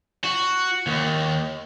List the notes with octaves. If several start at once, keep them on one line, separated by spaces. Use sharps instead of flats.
F#4
D#2